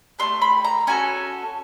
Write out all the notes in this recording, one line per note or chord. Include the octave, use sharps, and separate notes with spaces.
A3 D4 G4 C6
B5
A#5
C#4 F#4 A4 G#5